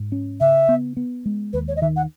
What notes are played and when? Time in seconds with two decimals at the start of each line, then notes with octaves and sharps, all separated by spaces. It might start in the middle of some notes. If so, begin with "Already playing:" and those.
Already playing: G#2
0.12 C#4
0.40 C#3 E5
0.69 B3
0.97 B3
1.25 G#3
1.53 D#2 B4
1.68 C#5
1.76 D#5
1.81 D#3 E5
1.96 F#5